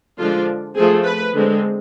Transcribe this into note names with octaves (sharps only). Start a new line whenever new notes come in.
D3 F3 G#3 D4 F4
F3 A3 C4 G#4
B4
D3 G#3 C4